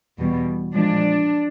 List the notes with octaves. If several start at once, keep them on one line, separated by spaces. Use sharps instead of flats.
E2 B2 G3
A#2 F3 G#3 D4